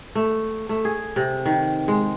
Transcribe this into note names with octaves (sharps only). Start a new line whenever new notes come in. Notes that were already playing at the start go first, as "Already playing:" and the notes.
A3
A3
G#4
C3
D#3
G#3